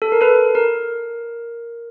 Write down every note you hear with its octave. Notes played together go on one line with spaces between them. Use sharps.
A4
A#4
A4 B4
A#4